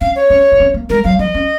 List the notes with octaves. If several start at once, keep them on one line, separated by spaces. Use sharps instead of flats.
C#4 F5
C#5
C#4
D#4
C#4
A#3
G#3 A#4
F#3 F5
F3 D#5
C#4